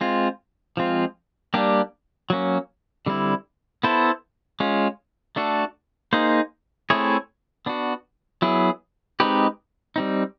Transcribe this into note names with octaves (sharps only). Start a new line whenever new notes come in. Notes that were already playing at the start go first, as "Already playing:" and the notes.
G#3 C4 F4
F3 G#3 C4 F4
G3 A#3 D4 G4
F#3 A#3 C#4
D3 G3 C4 E4
B3 E4 A4 C5
G#3 C#4 F4
A3 D4 F#4 A4
A#3 D#4 G#4 C5
A3 C4 E4 G#4 C#5
B3 D4 F#4
F#3 B3 E4 G#4
G#3 C4 D#4 G4 B4
G3 C4 D#4